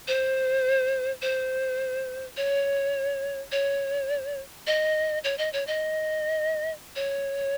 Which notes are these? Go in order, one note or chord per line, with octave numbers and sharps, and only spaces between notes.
C5
C5
C#5
C#5
D#5
C#5
D#5
C#5
D#5
C#5